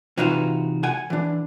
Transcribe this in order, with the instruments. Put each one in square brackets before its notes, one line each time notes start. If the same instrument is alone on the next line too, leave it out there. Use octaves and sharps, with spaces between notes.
[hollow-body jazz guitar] C3 E3 D#4 F4 F#4
F#5 G#5
E3 D4